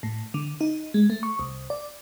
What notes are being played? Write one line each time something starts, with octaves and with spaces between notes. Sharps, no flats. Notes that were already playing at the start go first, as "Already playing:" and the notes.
A2
D3
D#4
G#3
A3
C#6
C2
D5